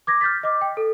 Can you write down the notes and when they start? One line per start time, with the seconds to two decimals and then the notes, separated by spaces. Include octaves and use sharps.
0.07 D6 G#6 A#6
0.21 F6 G6 A6 B6
0.43 D#5 D6
0.61 G5
0.77 A4